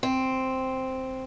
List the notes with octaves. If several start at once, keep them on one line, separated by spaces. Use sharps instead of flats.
C4